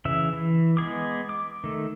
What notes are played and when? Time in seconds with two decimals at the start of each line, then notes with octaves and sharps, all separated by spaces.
0.05 C#3 E3 E5
0.33 E3
0.77 G#3 B3 G#4 D6
1.29 D6
1.64 D#3 A3